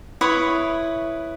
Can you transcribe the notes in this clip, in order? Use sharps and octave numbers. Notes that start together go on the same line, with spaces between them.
E4 B4 C#5 D#6